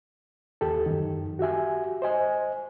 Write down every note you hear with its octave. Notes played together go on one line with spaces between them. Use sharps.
D#2 G4 A4
F#2 D#3
F#4 G4 E5 G#5
C5 D#5 G#5